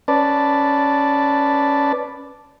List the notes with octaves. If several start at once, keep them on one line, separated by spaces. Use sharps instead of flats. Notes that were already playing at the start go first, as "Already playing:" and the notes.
C#4 B4 D5 A5